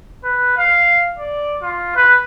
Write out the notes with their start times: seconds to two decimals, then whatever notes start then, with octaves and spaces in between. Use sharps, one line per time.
0.24 B4
0.57 F5
1.18 D5
1.62 F4
1.96 B4